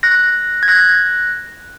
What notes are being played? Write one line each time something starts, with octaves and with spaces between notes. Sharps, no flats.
F#6 A#6
G#6
F#6 A#6